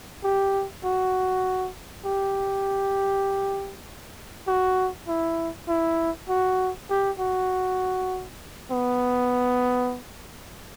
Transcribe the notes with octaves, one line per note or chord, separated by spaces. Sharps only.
G4
F#4
G4
F#4
E4
E4
F#4
G4
F#4
B3